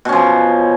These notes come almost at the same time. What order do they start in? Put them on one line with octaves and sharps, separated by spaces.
B2 C#4 F3